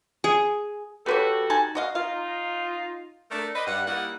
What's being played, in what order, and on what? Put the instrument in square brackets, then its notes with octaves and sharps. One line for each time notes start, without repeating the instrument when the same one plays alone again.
[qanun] G#4
[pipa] B3 B4 C#5 [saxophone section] F#4 G4 A4
[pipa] D#4 G#5 A5
F#4 D#5 F5
[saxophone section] D#4 F4 [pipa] F5
[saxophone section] A3 D4 A#4
B4 C5 D5 D#5
G2 F#5
G3 A#3 D#4 E4 A#4 F#5